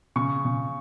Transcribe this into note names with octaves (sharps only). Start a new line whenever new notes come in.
C#3 C#6
C#3